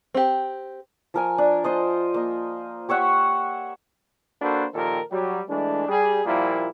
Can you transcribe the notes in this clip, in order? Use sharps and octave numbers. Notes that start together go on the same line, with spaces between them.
C4 G4
F3 A#4 G#5
D4
F4 C5 D#5
A#3 D#5
G4 C#5 E5 F#5
A#3 D4 F#4 A4 B4 C5
A#2 D#3 F3 G4 A4 A#4
F#3 G3
E3 G#3 A3 D4
G3 G#4
A#2 F3 G3 A#3 E4